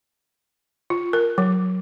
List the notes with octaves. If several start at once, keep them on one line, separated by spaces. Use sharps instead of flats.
F4
A#4
F#3